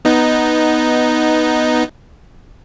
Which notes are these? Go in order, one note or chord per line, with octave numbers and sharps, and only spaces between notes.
B3 D#4